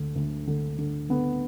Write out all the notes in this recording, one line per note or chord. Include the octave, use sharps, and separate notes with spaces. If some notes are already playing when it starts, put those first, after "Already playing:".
Already playing: D2 D3
D2
D3
D3
D3 B3